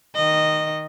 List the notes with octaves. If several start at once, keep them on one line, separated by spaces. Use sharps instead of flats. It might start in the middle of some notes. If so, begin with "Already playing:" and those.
D#3 D#5